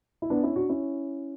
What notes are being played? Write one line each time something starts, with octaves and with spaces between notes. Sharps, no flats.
E4
B3 D4
C#4 E4
D4 F#4
C#4 E4